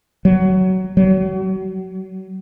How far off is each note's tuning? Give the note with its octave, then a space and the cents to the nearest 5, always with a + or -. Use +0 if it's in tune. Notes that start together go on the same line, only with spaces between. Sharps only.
F#3 +15
F#3 +35